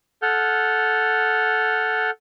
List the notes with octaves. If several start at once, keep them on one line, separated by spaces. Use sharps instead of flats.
A4 F#5 F6 G6